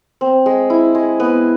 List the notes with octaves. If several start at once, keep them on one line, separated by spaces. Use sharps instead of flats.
C4
G#3
E4
G#3
B3